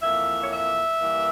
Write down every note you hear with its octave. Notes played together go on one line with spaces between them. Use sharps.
F2 E3 A#3 E5
C#5
E5
G2 E3 A#3